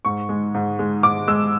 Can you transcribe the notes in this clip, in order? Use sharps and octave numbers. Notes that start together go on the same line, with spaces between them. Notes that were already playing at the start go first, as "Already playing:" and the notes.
G#2 C#6
G#3
G#2
G#3
G#2 D6
G#3 E6